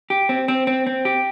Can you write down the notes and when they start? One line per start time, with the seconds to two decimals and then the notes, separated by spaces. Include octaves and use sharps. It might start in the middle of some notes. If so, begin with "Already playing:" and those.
0.10 G4
0.29 C4
0.48 C4
0.67 C4
0.87 C4
1.05 G4